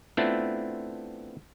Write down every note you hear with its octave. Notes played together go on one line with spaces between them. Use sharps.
A3 B3 C4 D4 E4 F4